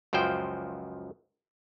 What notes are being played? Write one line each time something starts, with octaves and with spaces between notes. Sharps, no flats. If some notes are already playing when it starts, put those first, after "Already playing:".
C#2 F#2 F3 C5 G5